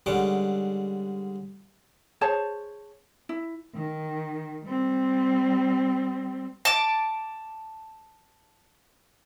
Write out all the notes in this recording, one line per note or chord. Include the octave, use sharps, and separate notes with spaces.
D3 G3 G#3 C#4 F#5 D6
G#4 C5 C#5 A5
E4
D#3
G3 C4
A5 D6